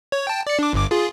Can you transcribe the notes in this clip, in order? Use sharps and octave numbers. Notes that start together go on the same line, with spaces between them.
C#5
G5 A5
D5 C#7
D4 D6
G1 G2 D6
F4 G#4